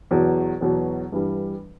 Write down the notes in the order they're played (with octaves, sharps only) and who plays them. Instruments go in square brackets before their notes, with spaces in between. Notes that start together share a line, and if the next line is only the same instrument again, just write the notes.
[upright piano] E2 B2 F#3
E2 B2 F#3
G2 E3 G3